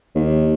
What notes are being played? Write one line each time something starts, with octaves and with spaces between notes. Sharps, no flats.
D#2